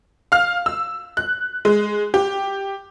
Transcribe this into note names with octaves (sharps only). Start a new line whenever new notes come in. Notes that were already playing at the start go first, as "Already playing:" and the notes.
F5 F6
E6
F#6
G#3
G4